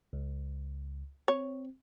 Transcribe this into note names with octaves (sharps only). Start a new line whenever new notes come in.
C#2
C4 C#5